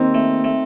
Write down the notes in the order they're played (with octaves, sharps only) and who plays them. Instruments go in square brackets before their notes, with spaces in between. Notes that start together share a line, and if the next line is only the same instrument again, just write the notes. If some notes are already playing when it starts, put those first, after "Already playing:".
Already playing: [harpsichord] D#2 [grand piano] C4 D#4
[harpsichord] A3
A3